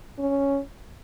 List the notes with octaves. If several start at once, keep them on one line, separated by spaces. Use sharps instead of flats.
C#4